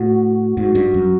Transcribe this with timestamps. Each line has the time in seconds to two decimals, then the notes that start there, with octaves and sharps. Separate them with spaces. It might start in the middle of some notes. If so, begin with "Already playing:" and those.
Already playing: A2 F#4
0.57 G#2 F#4
0.75 G2
0.94 F#2